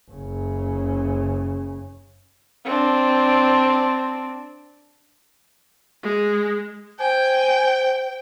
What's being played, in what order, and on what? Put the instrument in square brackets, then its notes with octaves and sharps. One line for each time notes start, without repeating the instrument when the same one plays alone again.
[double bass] F#1 C#3
[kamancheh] C4 D4
[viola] G#3
[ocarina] C5 [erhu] G5 [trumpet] G#5